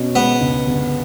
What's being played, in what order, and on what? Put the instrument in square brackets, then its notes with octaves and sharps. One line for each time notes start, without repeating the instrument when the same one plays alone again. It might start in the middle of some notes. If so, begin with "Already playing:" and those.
Already playing: [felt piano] B2 C#4
[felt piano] G#3 [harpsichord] B3
[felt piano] C#2
G1